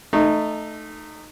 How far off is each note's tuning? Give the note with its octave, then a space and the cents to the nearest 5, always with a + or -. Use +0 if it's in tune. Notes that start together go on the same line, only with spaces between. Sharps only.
A3 +0 D#4 -20